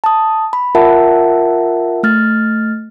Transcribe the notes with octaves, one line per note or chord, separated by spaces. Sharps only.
A5 D#6
B5
F4 A#4 E5 F#5 A5
A3 F6 A6